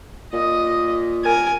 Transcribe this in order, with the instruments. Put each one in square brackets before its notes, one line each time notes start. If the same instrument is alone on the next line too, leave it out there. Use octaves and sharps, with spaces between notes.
[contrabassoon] A#2 [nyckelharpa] D#5
[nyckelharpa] A#4 G#5